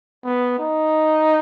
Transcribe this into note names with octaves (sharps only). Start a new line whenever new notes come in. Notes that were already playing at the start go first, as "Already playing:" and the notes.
B3
D#4